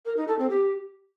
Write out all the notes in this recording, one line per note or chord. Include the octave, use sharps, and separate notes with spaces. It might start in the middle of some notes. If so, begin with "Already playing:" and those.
A#4
D#4
A4
C4
G4